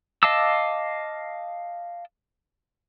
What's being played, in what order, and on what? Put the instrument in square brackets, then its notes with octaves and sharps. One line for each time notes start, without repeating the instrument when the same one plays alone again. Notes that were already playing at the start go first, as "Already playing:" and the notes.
[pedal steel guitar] D#5 F5 A5 D6 E6